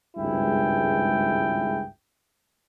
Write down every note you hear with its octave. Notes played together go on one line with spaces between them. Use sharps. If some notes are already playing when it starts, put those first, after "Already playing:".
G#1 C#2 G2 E4 G#4 G5